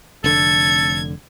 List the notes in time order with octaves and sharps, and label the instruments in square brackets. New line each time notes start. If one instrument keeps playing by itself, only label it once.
[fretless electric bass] F1 D3 [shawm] A4 [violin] G#6